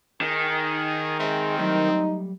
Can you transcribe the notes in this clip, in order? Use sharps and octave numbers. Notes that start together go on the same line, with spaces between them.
D#3 G#4
G#3 C4 C5 E5
F#3 G3 A3 D#4